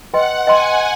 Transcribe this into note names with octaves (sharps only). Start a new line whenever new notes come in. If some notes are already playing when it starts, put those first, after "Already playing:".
B4 D#5 F#5 G5 C6
B4 D#5 G5 G#5 C6